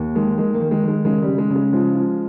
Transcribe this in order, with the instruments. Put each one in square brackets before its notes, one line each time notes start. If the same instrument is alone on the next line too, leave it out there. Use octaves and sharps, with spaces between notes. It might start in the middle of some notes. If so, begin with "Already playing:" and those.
Already playing: [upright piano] D#2
D#3 G#3
D#3 G#3
A#3
D#3
G#3
D#3 G#3
C#3 G#3
G3
C#3
G#3
C#3
G#3
F3 G#3
F3